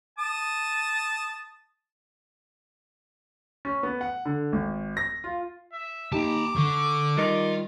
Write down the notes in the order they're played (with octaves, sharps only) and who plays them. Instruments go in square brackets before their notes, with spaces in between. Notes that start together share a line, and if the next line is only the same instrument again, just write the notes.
[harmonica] A5 D#6
[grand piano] C#4
B3
F#5
D3
G#1
A#6
F4
[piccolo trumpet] E5
[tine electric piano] A#3 D#4 G4 [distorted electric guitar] A5 A#5 [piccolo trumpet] D6
[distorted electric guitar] D3 [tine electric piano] C#6
[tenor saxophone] D#3 [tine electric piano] G3 [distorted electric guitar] F4